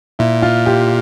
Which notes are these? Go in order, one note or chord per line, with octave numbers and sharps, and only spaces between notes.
A#2 E4
F4
G4